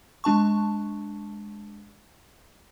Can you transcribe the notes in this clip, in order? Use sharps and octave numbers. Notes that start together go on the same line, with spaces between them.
G#3 D4 A5 C#6